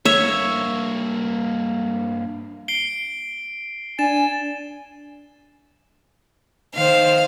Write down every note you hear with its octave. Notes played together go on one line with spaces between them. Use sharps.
G2 A#3 C#5 E5
C7 D7 G7
D4 G#5 A6 E7
D#3 C5 F5